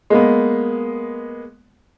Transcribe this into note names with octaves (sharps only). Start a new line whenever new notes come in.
G#3 A#3 B3